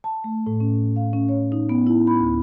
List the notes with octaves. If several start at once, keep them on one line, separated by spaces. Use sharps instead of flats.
A5
A3
A2
C#4
F5
C#4
C#5
D#4
B3
E4
B5
D2